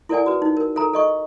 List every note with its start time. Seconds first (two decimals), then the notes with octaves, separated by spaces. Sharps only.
0.09 E4 A4 A#4 D5 F#5 G#5
0.26 F#4 B4
0.42 D#4
0.57 A#4
0.76 A4 A#4 A#5
0.93 A4 D#5 C#6